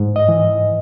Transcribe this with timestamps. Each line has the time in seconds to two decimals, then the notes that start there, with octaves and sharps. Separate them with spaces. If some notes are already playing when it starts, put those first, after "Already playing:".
Already playing: G#2
0.16 D#5
0.29 E3